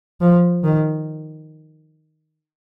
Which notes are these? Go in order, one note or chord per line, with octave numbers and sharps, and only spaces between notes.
F3
D#3